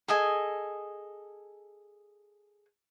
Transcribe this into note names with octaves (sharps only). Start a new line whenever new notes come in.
G#4 A4 D#5 G#5